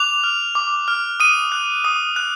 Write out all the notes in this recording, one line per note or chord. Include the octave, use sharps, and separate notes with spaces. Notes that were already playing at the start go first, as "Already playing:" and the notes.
Already playing: D6 F#6 F7
F6
D6
F6
D#6 D#7
F#6
D#6
F#6